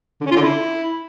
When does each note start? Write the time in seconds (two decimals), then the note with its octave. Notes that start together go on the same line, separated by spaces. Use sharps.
0.21 D3
0.26 C#4
0.31 F4
0.36 D3
0.41 E4